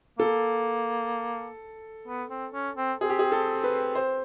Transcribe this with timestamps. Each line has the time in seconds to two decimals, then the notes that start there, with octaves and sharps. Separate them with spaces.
0.19 A#3 A4
2.08 B3
2.30 C4
2.54 C#4
2.77 C4
3.01 C4 G#4
3.10 G4
3.19 G#4
3.32 A4
3.64 B4
3.95 C5